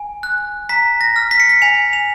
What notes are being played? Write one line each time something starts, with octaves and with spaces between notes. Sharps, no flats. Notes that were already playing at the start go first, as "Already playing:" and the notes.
Already playing: G#5
F#6
A#5 B6
A#6
F6
B6
C#7
B6
G#5 F7
F7